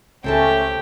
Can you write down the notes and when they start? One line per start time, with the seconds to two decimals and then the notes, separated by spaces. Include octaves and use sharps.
0.24 C#2 A3 C4 C#4 G4 A4 G5 A5